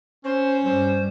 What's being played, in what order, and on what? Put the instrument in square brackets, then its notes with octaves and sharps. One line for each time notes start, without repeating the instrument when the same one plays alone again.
[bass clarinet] C#4 [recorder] C5
[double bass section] G2 G3 [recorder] C5